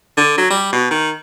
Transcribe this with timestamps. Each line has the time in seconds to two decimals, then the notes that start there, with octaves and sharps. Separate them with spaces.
0.17 D3
0.37 F#3
0.50 G3
0.72 B2
0.91 D#3